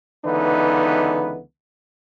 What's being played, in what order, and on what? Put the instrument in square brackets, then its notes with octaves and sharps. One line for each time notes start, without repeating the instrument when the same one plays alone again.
[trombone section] C#2 D3 E3 B3 D#4 B4